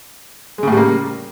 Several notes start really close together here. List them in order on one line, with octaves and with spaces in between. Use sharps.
G#3 C#3 A2 G3 A#3